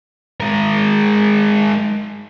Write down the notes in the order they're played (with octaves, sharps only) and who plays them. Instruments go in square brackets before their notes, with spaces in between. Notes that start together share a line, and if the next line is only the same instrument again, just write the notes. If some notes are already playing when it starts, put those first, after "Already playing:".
[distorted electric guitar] G#3 A#4